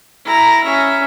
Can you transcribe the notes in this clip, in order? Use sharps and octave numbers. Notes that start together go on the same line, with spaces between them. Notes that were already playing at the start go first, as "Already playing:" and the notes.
E4 A#5
C#4 E5